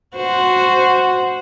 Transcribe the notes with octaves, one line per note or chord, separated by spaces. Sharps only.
F#4 C5